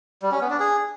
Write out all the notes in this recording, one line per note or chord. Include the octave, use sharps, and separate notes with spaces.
G3
C#4
B3
D4
G#4